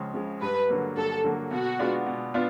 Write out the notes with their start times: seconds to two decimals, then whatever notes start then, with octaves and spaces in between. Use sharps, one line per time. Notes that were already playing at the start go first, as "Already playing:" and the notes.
Already playing: C#2 C#3 F3 G#3
0.14 C#3 F3 G#3
0.41 G2 B4
0.69 D3 F#3 A#3
0.96 G2 A4
1.24 D3 F#3 A#3
1.51 B2 F#4
1.79 G#3 B3 D4 F4
2.06 B2
2.34 B3 D4 F4